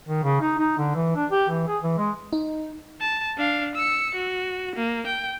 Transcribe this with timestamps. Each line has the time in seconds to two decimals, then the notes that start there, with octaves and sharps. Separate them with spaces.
0.08 D#3
0.23 C#3
0.41 D#4
0.59 D#4
0.78 D3
0.95 E3
1.15 D4
1.31 G4
1.49 E3
1.68 G#4
1.82 E3
1.98 G#3
2.33 D#4
3.00 A5
3.37 D4 F5
3.75 E6 C#7
4.15 F#4
4.76 A#3
5.07 G5